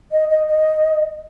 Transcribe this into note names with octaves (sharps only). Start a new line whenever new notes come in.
D#5
D#5
D#5